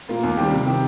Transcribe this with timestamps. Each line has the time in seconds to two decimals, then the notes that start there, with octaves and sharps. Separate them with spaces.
0.09 A#2 A#3 F4
0.23 D#2
0.37 D#3 G3 C4 G4
0.52 C3
0.66 D#3 C4 G4